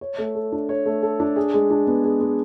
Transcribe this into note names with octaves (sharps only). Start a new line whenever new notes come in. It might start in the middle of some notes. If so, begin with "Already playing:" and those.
C#5
A3
A4
D4
C#5
A3
A4
D4
G#4
G#3
D4
B3
G#4
G#3